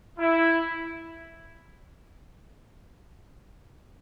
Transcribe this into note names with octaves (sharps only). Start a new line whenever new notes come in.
E4